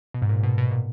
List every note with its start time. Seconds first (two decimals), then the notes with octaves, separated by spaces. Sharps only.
0.14 B2
0.22 G#2
0.29 A#2
0.43 B2
0.58 B2
0.71 A#2